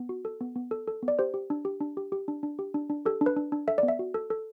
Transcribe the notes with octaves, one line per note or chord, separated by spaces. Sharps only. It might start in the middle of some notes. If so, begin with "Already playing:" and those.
Already playing: B3
F#4
A4
B3
B3
A4
A4
B3
D5
G4 C5
G4
D4
G4
D4
G4
G4
D4
D4
G4
D4
D4
G4 A4
D4
B4
D4
D4
A4 E5
B3 D5
E5
F#4
A4
A4